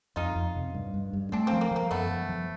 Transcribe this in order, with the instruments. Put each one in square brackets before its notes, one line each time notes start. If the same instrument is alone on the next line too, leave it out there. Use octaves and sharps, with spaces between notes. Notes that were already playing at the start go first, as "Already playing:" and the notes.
[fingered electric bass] F2 [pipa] D#4 F4
[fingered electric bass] F2
C3
G2
G2
G2
[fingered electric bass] A3 [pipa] C4 D4
[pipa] A#3 C4
[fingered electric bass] F3
[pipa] A#3
[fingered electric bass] F3 [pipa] A#3
[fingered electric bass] F#2 [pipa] A3 B3
[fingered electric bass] F3
F3